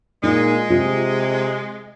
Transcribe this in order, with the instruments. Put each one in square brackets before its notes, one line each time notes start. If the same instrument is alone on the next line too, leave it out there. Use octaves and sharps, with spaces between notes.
[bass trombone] A#2 [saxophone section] G#3 [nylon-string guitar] D#4
[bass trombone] C3 [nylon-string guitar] F4